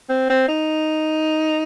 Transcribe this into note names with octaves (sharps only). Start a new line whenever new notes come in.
C4
C4
D#4